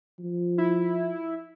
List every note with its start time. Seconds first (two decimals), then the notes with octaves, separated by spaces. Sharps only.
0.19 F3
0.58 E4